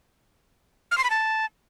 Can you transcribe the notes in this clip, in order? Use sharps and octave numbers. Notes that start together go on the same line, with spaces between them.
F6
C6
B5
A5